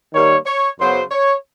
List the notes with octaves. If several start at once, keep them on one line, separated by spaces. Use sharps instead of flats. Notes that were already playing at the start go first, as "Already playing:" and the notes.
D#3 G3 A#3 C#5
C#5
F#2 C#3 F#3 B3 C5
C#5